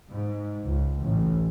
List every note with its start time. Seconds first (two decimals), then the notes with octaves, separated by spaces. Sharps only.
0.11 G#2
0.64 C#2
1.01 A1